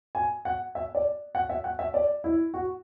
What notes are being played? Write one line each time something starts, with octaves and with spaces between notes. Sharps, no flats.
G#5
F#5
E5
D5
F#5
E5
F#5
E5
D5
E4
F#4